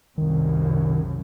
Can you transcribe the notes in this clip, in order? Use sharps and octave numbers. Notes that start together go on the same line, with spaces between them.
C2 F#2 D#3